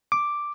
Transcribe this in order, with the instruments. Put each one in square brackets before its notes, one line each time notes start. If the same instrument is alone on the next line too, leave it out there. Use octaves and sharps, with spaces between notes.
[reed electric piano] D6